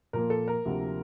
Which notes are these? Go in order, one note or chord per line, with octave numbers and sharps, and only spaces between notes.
A#2 F3 A#3 A#4
A4
A#4
D2 C3 F3 A#3